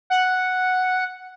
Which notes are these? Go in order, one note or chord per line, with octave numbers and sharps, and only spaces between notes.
F#5